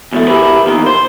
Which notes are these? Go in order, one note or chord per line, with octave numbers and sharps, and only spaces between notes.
E2 B2 A3
E4 G4 G#4 A#4 B4
E2 A#2 D#3 A#3
C5